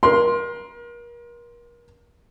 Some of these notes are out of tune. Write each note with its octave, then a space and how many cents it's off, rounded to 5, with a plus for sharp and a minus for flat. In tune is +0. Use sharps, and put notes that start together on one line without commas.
A#4 +35 C6 +0